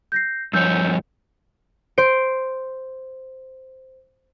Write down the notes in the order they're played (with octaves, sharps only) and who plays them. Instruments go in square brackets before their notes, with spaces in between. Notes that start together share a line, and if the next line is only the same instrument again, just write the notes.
[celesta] G6 A#6 C7
[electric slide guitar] G2 F3 C#5 [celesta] E6 G6
[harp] C5 D7